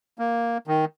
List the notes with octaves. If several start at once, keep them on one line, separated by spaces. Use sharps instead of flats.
A#3
D#3